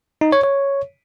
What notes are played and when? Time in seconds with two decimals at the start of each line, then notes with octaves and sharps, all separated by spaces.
0.21 D#4
0.32 C#5
0.44 C#5